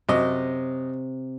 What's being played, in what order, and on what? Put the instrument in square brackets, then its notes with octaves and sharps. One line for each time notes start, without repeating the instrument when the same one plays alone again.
[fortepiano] F#2 D#5 [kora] C3